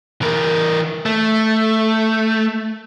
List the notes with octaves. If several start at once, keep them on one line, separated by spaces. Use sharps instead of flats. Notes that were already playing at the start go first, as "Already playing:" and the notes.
E3 A#4
A3